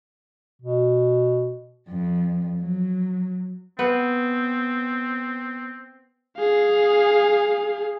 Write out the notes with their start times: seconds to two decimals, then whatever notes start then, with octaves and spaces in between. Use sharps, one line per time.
0.62 B2
1.89 F2
2.62 F#3
3.79 B3 C4
6.38 G#4 F5